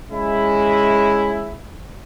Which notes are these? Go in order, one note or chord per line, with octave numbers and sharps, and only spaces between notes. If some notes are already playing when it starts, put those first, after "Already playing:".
G#3 C#4 E4